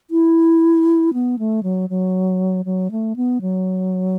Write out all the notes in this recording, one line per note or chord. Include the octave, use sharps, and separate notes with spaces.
E4
B3
A3
F#3
F#3
F#3
A3
B3
F#3